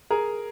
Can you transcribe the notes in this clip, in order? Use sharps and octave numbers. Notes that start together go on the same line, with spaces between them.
G#4 A#4